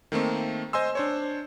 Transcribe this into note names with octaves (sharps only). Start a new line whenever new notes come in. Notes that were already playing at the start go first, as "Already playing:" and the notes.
D#3 A3 A#3 C4
C5 D#5 G#5 C6 E6
D4 C5 C#5